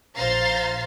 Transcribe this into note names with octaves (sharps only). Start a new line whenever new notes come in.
A#1 C5 F5 A#5 A6 C7